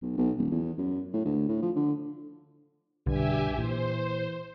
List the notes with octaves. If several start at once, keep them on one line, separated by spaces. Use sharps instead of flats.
B1
B1
D#1
E2
F#2
A2
D2
A2
F3
D3
B1 G2 D3 G4 E5 G#5
A#2 E3 C5